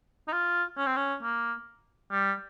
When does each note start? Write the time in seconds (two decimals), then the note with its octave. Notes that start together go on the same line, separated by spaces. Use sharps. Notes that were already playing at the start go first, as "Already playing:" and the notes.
0.28 D#4
0.32 F4
0.77 C#4
0.86 C4
0.96 C#4
1.22 A#3
2.11 G3